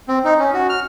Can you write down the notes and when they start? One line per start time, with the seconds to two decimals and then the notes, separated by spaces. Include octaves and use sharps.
0.08 C4
0.25 D#4
0.39 C#4
0.53 F#4
0.70 F6